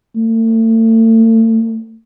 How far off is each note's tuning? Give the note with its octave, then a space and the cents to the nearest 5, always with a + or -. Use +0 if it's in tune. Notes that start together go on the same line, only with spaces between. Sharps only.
A3 +40